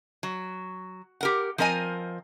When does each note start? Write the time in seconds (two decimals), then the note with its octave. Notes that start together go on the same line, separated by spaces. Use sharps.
0.23 F#3
1.21 G4 A#4 F#5
1.58 F3 C4 A#4 D#5 G#5